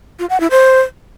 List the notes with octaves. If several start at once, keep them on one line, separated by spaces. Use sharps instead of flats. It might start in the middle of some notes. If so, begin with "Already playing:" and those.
F4
F#5
E4
C5